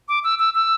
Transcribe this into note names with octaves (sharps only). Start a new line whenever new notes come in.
D6
E6
E6
E6